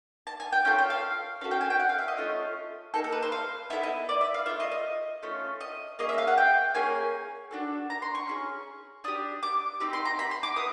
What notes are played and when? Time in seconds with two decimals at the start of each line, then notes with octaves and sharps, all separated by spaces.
0.27 A5
0.40 G#5
0.53 G5
0.65 C#4 F4 A4 G5
0.79 G5
0.90 F5
1.41 C#4 F5
1.44 F#4 A4
1.51 G5
1.61 G#5
1.70 G5
1.80 F#5
1.89 F5
1.99 E5
2.08 D#5
2.17 A3 C#4 F4 A4
2.94 A#3 D#4 G#4 A4
3.04 A4
3.12 B4
3.22 C5
3.32 F5
3.70 B3 E4 A4 E5
3.83 D#5
4.09 D5
4.21 E5
4.34 F5
4.46 A3 D4 F4 E5
4.60 D#5
4.71 D#5
5.23 A3 C#4 F4
5.61 D#5
5.99 A#3 C#4 G#4 D#5
6.09 E5
6.18 F5
6.27 F#5
6.38 G5
6.75 A#3 C#4 G#4 G#5
7.51 D4 F#4 A4
7.90 A#5
8.02 C6
8.15 C#6
8.27 C#4 E4 G#4
9.04 D4 G4 D#6
9.43 D6
9.80 C4 D#4 G4
9.93 C6
10.05 A#5
10.19 B5
10.31 C6
10.43 D6
10.56 B3 E4 D#6